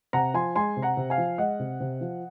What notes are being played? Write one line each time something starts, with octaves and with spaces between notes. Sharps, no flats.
C3 F#5 A#5
F3 G#5 C6
G#3 G#5 C6
C3
F#5 A#5
C3
F5 G#5
F3
G#3 D#5 F#5
C3
C3
F3